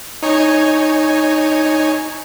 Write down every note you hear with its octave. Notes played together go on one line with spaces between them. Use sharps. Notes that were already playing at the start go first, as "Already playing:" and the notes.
D#4 C#5 G#5